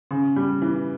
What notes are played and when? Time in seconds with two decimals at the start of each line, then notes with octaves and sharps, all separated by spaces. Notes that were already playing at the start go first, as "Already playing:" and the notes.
0.11 C#3
0.36 G3
0.62 E3